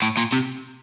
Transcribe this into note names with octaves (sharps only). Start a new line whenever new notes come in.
A2
A#2
C3